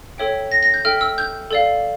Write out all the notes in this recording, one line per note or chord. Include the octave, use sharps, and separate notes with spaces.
A4 C#5 E5 G5
A#6
A#6
G6
A4 E5 G5 F6
E6
G6
A4 D5 F5